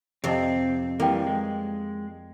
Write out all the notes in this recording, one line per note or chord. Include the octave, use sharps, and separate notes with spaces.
F2 C3 C4 G4 D#5
E3 G3 A#3 A4 G5
G#3